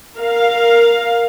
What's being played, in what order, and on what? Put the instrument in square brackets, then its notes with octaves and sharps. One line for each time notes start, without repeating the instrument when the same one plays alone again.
[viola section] A#4 F5